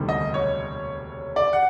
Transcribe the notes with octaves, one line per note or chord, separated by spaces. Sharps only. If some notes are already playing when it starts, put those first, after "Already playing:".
Already playing: E1 D2 C3 D#3 G3
D#5
C#5
D5
F#5